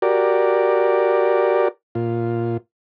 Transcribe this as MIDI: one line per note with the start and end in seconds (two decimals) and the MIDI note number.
0.02 1.68 66
0.02 1.68 67
0.02 1.68 70
0.02 1.68 74
1.95 2.57 46
1.95 2.57 65